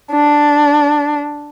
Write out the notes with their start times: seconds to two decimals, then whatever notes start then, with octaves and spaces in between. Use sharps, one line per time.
0.12 D4